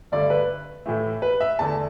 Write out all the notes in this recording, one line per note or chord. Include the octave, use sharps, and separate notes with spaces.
G2 D3 A3 D5
B4
A2 E3 A3
B4
E5
E2 D3 A3 A5